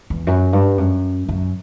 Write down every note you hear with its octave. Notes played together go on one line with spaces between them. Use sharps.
E2
F#2
G2
F#2
F#2